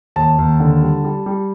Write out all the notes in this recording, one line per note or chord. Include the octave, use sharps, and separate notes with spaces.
D#2 A5
D#2
D3
G3
G3
G3